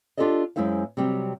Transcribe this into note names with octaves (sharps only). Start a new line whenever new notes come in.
D4 F4 G4 A4 D5 D#5
F#2 G#3 E4 C5 F5
C3 F#3 G3 C4